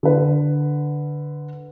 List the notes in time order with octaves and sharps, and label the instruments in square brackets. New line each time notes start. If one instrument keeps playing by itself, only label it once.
[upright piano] D3 B4